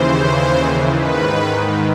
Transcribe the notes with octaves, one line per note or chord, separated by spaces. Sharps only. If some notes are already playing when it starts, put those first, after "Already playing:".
Already playing: D#2 C#3 E3 C5
G#2 D#3 B4